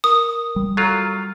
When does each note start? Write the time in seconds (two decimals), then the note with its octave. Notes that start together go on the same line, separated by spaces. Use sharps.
0.04 A#4 D#6
0.56 G3
0.77 F#3 F4 A4 A#5 F6